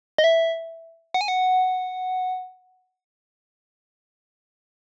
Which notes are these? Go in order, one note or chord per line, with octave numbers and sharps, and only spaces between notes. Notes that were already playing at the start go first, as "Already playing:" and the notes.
D#5
E5
F#5
G#5
F#5